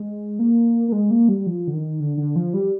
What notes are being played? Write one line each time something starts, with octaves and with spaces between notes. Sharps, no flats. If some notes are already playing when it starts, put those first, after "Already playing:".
Already playing: G#3
A#3
A#3
G#3
A#3
G3
F3
D3
D#3
D3
D3
F3
G3